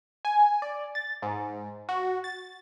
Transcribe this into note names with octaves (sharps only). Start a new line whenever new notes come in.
G#5
D5
A6
G#2
F#4
A6